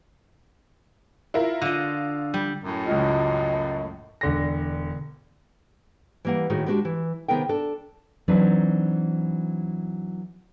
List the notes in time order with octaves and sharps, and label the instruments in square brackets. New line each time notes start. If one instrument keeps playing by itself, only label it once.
[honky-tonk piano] E4 F4 A#4
[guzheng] D3 D#5 [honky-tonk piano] F4
[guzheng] G3
[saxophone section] F#2 A2
[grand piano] C#2 F3 [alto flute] D#5
[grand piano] E1 D3 A#6
[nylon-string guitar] E3 G3 A#3 B4 F#5
A2 D#3 F#4 G#4
G3 G#3 B3 D4 F#4 G4
E3
C3 D#3 B3 G#4 A#4 G5
D4 A4
E3 F#3 C4 D4 D#4 B4